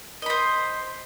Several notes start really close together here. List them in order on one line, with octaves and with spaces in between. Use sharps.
D#5 B5 C5